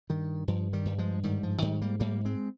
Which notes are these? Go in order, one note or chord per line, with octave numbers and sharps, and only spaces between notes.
G2 D#3
G2 F3
D#3 G3
G2
F3 G#3
G#2 D#3 G3
F3
G#2 D#3 G3
G3 A#3
G#2 G3 A#3
G#3 C4